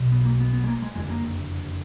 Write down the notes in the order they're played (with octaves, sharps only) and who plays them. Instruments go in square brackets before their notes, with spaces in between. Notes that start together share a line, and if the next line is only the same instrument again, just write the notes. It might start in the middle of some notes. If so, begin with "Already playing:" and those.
Already playing: [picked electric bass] B1 B2
B3
A#3
B3
B3
G#3
A#3
G#3
F#1 F2 D3 G#3
A#3